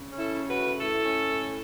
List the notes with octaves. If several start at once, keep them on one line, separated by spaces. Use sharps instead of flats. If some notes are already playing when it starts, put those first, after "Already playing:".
Already playing: C#3
C#4
E4 A4
C#3
F#4 B4
A3
A2 E4 A4
C#4
A2